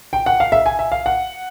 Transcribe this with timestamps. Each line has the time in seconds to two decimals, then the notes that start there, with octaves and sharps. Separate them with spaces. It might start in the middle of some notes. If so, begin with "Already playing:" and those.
0.13 G5
0.26 F#5
0.40 F5
0.52 E5
0.66 G#5
0.79 E5
0.92 F5
1.06 F#5